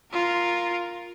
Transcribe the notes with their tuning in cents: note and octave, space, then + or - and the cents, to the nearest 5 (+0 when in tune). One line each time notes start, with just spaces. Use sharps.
F4 +0 A#4 +0